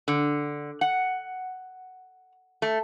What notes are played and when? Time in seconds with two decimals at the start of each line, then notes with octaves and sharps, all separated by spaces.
0.08 D3
0.81 F#5
2.62 A3